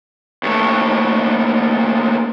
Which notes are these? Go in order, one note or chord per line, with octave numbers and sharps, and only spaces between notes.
D#2 A3